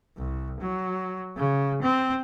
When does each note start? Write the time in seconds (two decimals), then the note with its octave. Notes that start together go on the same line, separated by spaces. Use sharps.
0.17 C2
0.60 F#3
1.37 C#3
1.82 C4